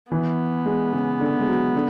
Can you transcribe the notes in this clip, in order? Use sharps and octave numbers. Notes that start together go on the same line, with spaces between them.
E3 B3
G#3
C#3
D3
G#3
F#3
D3